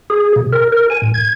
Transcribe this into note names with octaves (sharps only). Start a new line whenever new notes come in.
G#4
B2
A#4
A#4
G#5
A2
G#6